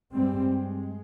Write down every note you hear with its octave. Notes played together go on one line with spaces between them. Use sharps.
G2 G3 G#3 C4